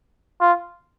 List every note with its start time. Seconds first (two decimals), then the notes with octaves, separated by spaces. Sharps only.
0.41 F4